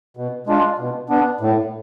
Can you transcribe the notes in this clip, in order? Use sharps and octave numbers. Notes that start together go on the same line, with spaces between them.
B2
G#3 D4 F4
B2
B3 D4
A2